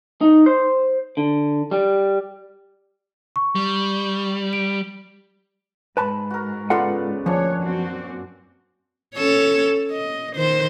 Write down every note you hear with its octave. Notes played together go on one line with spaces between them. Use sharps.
D#4
C5
D3
G3
C#6
G3
D7
G#2 B4 A5 B5
F#4 A#4
C#3 B3 F4 A4 D5 F#5
D2 A#2 F3 C#4 D4 C#5
F#2 C4 F#4
C#4 A4 C#5
D#5
D#3 C5